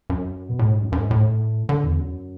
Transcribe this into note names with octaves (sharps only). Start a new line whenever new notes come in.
F#2
B2
A2
G#2
F#2
F#2
G#2
A2
D3
E2
F#2